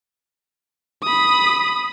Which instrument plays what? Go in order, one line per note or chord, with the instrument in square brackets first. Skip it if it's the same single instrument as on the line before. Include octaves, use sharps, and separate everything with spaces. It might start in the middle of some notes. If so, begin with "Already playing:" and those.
[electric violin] B5 D#6